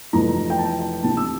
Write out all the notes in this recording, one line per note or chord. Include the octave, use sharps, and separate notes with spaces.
F1 F2 E3 A#5
G5
A5
G5
D2 C3 E3 A5
E6